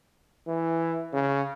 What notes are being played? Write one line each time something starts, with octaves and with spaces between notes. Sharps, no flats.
E3
C#3